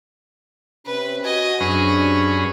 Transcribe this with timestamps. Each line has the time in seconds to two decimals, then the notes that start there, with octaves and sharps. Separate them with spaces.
0.86 C3 C#4 B4
1.25 F#4 D#5 G#5
1.60 F#2 C3 C#4 D4 G#4 B4